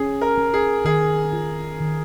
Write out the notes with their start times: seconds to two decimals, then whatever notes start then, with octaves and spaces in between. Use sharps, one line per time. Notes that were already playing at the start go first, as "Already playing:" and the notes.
Already playing: C#4 G#4
0.21 A#4
0.38 C#4
0.54 G#4
0.85 D#3 G#4
1.33 F4
1.80 D#3